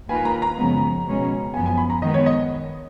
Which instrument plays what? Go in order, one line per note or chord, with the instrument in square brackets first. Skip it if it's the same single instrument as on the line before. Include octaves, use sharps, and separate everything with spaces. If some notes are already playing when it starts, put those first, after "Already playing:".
[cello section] D#2 D#3 A#3 F4 B4 [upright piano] G#5
[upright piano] A#5
A#5
[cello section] F#2 C#3 F3 G#3 B3
B2 G#3 C#4
[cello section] F#2 F3 B3 [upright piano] G#5
[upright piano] G#5
B5
A#5
[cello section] D#3 G#3 B3 [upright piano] D#5
[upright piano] C#5
D#5